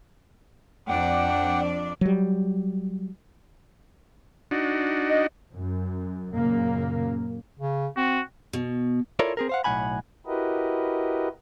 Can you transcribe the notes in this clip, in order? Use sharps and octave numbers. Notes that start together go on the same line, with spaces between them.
F2 D4 D5 F#5 G5
F#3 G3
D4 D#4 F#4
D#5
F#2
F#2 A#2 C#3 A#3
C#3
C4 F#4
B2
E4 F4 A4 A#4 C#5 D5
C4 G#4 A#4
C5 F5 F#5
B1 F#2 A2 F#5 G#5 B5
E4 F#4 G4 A#4 B4 D#5